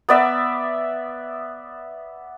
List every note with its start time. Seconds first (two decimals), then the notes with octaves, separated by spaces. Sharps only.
0.09 B3 D5 E5